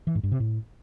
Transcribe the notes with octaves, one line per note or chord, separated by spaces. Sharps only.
E3
G#2
G2
C3
A2